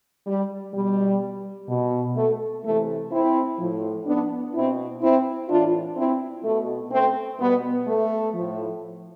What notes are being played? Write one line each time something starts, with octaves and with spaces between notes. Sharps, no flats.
G3
B2 G3
B2
A3
C3 E3 A3
C4 E4
A2 F3
B3 D4
B2 C4 E4
C4 E4
A2 E3 D4 F4
C4 E4
B2 A3
A3 C4
B2 G3 B3
A3
A2 F3